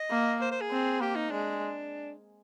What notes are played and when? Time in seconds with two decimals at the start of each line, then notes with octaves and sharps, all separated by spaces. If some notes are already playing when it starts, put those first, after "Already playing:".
Already playing: D#5
0.10 A#3
0.41 C5
0.51 C5
0.61 G#4
0.71 C4
1.00 A#3 G4
1.16 D#4
1.31 G#3 D4